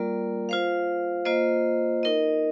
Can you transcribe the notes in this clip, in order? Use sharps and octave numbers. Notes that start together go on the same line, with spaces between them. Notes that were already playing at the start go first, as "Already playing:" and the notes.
Already playing: G3 A#3 F4 A#4 D5
F4 C5 F5
A#3 F4 C5 D#5
D#4 A#4 D#5